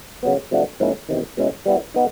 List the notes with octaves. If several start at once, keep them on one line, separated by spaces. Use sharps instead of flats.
C#3 F#3 B3
C3 F3 A3 D4 F#4
G#2 F3 A#3 C#4 E4
E2 C3 D#3
B2 G#3 C#4 E4
G3 B3 E4
B3 D#4